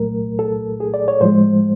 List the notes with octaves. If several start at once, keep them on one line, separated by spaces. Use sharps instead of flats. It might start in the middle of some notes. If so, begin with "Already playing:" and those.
Already playing: C2 A#2 F#3 A3 A#4
A4
G#4
D5
C#5
A2 F3 G#3 C5